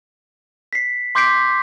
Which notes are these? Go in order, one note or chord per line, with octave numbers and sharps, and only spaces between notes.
B6 C7
C6 D6 G6 B6 C7 D7